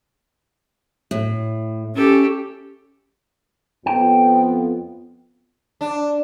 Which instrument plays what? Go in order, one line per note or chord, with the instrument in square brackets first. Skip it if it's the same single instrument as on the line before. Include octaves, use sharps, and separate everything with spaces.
[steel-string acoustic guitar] A2
[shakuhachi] C#4 [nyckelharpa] G4 A4
[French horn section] F2 B3 F4 [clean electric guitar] G5
[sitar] D4